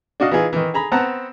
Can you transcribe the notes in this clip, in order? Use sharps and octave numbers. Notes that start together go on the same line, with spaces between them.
D4 F#4 D#5 F5
E3 D#4 F4 G#4
D#3 E3
G#4 A#5 B5
B3 C4 F#5 A5 A#5